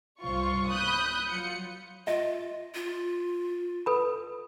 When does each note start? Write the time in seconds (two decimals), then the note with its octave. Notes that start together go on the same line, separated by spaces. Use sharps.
0.22 C2 G2 F4 C5 C#6
0.69 B5 D#6 F#6 G6
1.29 F#3 F4 C#7
2.07 F4 D#5 E5
2.75 F4
3.86 A4 B4 B5